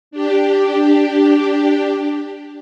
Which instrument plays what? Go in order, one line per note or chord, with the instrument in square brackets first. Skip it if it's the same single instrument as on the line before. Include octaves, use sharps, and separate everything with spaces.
[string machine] D4 G4